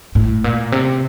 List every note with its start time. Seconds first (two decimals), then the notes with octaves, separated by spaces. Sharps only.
0.15 A2
0.44 A#2
0.72 C3